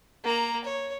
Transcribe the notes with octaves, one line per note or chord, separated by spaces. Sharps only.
A#3 A#5
C#5